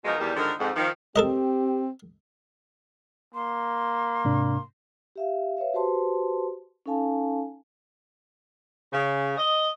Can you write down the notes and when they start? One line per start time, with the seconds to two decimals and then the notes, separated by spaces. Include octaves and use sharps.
0.04 F#2 B2 F3 G#3 D#4 A#4
0.19 E2 D#3 G3
0.36 G#2 D3 D#3 F3 D#4 A#4
0.59 F2 G#2
0.75 D#3 F3
1.16 C4 G4 A4 A#4 D#5
3.34 A#3 C6
4.25 G#2 C3 D4
5.16 G4 E5 F5
5.57 B4 C#5 E5 F5
5.74 F#4 G4 B4 C5 A5 C6
6.86 C#4 D#4 A4 F5 G#5 A5
8.93 C#3
9.37 D#5